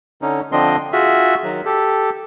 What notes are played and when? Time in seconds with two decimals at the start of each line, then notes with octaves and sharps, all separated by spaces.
0.22 D3 C#4 D#4
0.52 D3 F3 C4 D4 D#5 C6
0.92 F4 F#4 G#4 E5
1.44 D#3 F#3
1.65 G4 A4